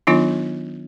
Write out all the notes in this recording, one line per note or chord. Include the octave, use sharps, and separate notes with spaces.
D#3 F#3 B3 D4 D#4 F4